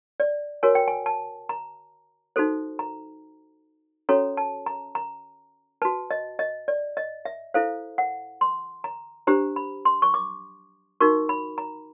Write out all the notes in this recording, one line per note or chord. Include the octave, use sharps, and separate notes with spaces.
D5
F#4 A#4 C#5 G#5
G5
G#5
A5
A#5
D#4 F#4 A4 C5
A#5
C#4 F#4 A4 C#5 A#5
A5
A#5
A#5
F#4 B4 A5
D#5
D#5
D5
D#5
E5
E4 A4 C5 F5
F#5
C6
A#5
D4 G4 C5 A#5
B5
C6
C#6
D6
D#4 F#4 A#4 C#6
B5
A#5